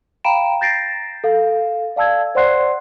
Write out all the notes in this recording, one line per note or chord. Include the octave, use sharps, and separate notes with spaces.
F5 G5 A#5 B5 D7 E7
G6 A6 A#6 C7 D7
A4 F5
D5 F5 A5 E6 G#6
C5 D5 F#5 C6 F#6 C7